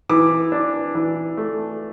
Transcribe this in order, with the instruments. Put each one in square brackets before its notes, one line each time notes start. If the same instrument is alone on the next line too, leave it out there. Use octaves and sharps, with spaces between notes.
[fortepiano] E3 [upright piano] D6
[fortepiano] D4
E3
A3